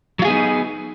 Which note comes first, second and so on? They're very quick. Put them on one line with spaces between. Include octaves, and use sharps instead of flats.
F#3 F4 G#4 B3 D#4